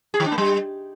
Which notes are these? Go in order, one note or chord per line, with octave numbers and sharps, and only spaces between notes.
G#4
D#3
D4
A#3
G3